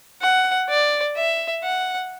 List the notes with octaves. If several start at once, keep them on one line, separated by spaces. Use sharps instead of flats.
F#5
D5
E5
F#5